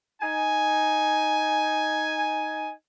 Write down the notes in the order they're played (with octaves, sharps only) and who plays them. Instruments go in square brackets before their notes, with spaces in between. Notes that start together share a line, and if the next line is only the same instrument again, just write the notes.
[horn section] D#4 G#5